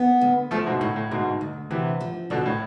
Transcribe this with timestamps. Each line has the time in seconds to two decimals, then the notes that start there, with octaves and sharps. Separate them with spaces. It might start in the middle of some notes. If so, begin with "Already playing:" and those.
Already playing: B3
0.21 D2
0.51 D2 F3 A3
0.66 G#2 B2
0.81 D2 A2
0.96 A2
1.11 D2 G#2 B2
1.41 D2
1.70 D2 C3 E3
2.01 F3
2.30 B2 D3 D4
2.46 A2